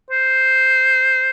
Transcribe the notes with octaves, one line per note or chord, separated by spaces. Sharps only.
C5